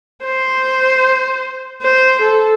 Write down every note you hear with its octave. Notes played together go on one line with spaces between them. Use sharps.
C5
C5
A4